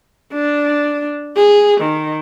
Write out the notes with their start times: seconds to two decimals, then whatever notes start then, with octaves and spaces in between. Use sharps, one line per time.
0.33 D4
1.36 G#4
1.81 D#3